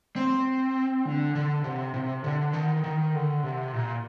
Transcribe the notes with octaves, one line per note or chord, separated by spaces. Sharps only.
C4
D3
D3
C3
C3
D3
D#3
D#3
D3
C3
A#2